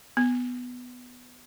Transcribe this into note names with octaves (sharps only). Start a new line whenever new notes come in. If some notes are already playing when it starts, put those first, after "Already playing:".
B3